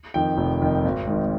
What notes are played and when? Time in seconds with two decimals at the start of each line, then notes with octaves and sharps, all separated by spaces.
0.14 F2 D#3 G5
0.37 F1
0.62 F2 D#3
0.85 G#1
1.07 G#2 D#3